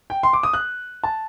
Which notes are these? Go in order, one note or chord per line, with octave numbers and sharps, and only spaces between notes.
G5
C6
D6
D#6
F#6
A5